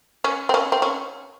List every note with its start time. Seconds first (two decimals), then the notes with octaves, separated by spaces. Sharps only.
0.24 C#4
0.49 C4
0.54 C#4
0.72 C4
0.82 C#4